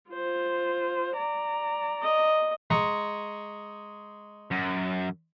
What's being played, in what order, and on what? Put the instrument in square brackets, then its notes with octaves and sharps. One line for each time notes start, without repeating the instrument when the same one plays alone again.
[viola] F4 C5
D5 A#5
[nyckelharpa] D#5
[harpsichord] G#3 A#5 C#6
[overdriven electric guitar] F#2